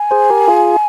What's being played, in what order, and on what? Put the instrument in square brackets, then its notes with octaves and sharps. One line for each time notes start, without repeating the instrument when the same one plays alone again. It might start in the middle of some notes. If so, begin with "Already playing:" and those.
Already playing: [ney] G#5
[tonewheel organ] G#4 C5
G4 A#4
F4 G#4